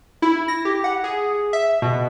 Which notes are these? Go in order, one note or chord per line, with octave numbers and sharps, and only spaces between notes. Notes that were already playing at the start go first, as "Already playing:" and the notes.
E4
A#6
G4
F#5
G#4
E5
B2